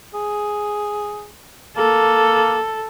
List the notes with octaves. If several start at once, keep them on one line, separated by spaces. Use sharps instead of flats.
G#4
A#3 A4